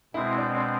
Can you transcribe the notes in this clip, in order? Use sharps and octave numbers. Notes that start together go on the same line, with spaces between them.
B2 G#3 C4 E4
D4
D4